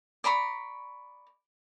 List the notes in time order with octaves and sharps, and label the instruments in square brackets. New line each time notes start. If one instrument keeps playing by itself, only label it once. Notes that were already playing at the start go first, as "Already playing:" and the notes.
[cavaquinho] D5 A#5 B5 C#6